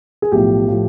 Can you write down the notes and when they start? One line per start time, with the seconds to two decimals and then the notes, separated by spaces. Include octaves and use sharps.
0.22 G#4
0.32 B1 A2 F3 G4
0.68 A2 F3